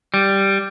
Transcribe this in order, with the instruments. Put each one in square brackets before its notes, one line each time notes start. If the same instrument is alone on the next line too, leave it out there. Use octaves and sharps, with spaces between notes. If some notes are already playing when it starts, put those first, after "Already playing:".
[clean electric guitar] G3